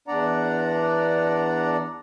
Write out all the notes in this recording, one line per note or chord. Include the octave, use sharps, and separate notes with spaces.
E2 D4 D5 F#5 A#5